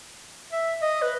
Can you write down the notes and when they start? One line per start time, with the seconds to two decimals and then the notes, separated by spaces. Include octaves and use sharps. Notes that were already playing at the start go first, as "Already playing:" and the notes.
0.52 E5
0.82 D#5
1.02 B4